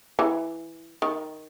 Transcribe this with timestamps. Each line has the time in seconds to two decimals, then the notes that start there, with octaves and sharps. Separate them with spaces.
0.19 E3
1.02 D#3